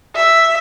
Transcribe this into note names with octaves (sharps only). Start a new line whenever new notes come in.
E5